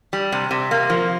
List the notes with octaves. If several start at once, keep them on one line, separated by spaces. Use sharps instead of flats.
G3
C3
C3
A#3
F3